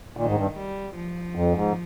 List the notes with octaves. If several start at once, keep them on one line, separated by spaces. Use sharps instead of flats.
A#2 D#3
G#2
G2
G3
F3
F2
G#2